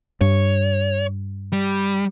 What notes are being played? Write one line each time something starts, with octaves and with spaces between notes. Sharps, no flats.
G2 C#5
G3